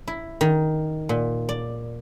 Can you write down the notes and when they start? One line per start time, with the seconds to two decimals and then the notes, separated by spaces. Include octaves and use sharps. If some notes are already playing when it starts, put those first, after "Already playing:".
0.07 E4
0.41 D#3
1.09 A#2
1.49 D5